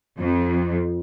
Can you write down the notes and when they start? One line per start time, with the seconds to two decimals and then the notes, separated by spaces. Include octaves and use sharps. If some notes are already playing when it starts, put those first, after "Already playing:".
0.18 F2